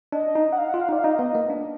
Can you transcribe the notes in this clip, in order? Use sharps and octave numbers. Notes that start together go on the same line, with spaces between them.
D4 D#5
D#4
F#5
F5
F4 F#5
F5
D#4
D5
F5
D#4 D#5
B3
A#3
D4